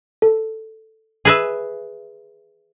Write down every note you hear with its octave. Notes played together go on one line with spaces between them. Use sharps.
A4
G#4 B4 E5